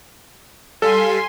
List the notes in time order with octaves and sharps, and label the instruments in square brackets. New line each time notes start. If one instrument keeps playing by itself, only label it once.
[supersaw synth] G3 F5 B6 [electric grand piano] A4 [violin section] G#5 C6